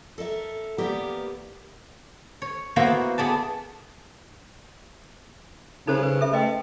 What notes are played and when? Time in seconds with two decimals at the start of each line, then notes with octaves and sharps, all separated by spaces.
0.18 A4 A#4 D5 E5
0.78 E3 A#3 B3 G4 A#4 D5
2.42 C#5
2.76 A#3 B3 E4 F#4 C5
3.18 B3 G#4 D5 A5
5.87 C#3 D#4 A4 C5
6.03 B4
6.21 A4 E5
6.33 A3 B4 D#5 G5